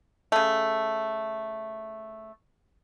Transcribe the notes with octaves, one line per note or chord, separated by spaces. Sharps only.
C#3 A3